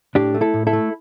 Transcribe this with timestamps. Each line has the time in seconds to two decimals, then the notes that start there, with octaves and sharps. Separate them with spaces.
0.15 A2 D4 G4
0.34 A3
0.41 E4 A4
0.54 A2
0.67 E4 A4
0.73 A3